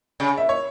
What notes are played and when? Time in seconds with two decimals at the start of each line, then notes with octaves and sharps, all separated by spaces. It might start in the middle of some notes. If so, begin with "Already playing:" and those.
0.20 C#3
0.37 E5
0.49 C#5